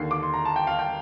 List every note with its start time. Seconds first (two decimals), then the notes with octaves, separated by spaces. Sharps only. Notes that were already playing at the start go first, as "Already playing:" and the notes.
Already playing: D#2 D3 C7
0.11 D6
0.23 C6
0.33 A#5
0.45 A5
0.56 G5
0.67 F5
0.79 G5